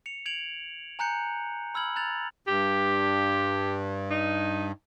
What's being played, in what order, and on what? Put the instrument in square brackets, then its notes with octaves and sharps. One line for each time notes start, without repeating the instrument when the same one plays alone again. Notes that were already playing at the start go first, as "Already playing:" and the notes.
[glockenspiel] C#7 F7
G#6 D7 F7 F#7
G#5 A#5 F#6 G6 C#7
B5 E6 F6 G#6 F#7
A#5 F#6 G#6 A6 F7
[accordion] G2 [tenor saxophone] G4
[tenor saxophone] D#4